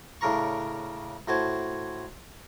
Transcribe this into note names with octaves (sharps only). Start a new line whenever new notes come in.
A2 C#3 D4 A#4 A#5 C#6
A2 F#4 C5 G#5 A5